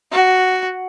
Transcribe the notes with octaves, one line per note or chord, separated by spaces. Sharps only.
F#4